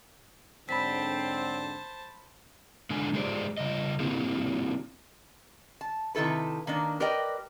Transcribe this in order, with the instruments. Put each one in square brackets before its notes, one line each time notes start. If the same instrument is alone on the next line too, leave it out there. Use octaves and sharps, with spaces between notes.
[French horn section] G#2 D3 F#3 [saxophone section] C4 [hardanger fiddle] C5 A5 [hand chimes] B5 B6
[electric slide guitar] D3 G#3 D4 G#5
G#3 G4 G#4 C5 D5
C#3 G3 D#5
A#3 C4 E4 F#4 G4
[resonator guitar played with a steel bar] A5
C3 D#3 E4 A4 B4
D#3 A#3 D4
G4 A#4 B4 D5 D#5 G5